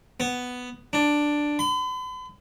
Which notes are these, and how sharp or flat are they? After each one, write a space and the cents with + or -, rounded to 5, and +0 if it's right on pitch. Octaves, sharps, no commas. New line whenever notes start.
B3 +5
D4 +5
B5 +45